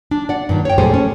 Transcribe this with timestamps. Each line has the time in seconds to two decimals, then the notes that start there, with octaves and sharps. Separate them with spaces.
0.11 D4
0.29 D5 F#5
0.49 G2 A#2 D#3
0.65 C#5 G5
0.78 F2 A#2 G3 A3 G#4 C5
0.94 C#4